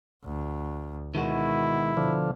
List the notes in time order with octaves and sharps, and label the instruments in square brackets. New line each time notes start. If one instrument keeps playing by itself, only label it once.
[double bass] D2
[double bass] B2 [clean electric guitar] D#3 G#3 F#4 [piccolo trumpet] E4
[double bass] B2 [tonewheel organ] D3 F3